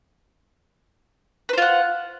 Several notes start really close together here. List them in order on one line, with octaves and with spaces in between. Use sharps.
B4 C5 F4 F#5